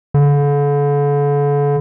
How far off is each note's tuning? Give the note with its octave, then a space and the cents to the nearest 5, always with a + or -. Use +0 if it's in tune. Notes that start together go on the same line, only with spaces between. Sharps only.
D3 -40